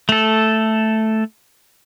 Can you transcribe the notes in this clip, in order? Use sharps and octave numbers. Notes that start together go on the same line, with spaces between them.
A3 A4